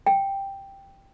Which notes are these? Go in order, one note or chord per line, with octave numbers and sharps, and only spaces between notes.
G5